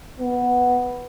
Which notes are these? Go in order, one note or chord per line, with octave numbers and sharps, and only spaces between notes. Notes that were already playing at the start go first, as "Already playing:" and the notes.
B3